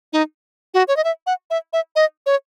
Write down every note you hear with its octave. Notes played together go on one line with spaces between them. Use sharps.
D#4
F#4
C#5
D#5
E5
F#5
E5
E5
D#5
C#5